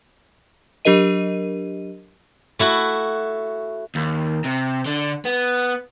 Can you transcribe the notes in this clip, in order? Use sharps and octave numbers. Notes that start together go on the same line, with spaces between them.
F#3 D4 G4 A#4 D#5 D#7
A3 E4 F#4
D#2
C3
D3
B3